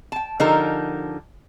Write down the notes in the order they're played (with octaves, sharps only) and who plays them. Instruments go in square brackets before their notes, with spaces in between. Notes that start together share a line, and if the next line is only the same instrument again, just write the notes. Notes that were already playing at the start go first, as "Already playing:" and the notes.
[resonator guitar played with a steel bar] G5 A5
D3 F3 D#4 G4 A4 A#4